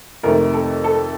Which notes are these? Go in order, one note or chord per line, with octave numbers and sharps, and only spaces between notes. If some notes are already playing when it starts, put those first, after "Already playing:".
F2 C3 D#3 A3 A#4
A4
A4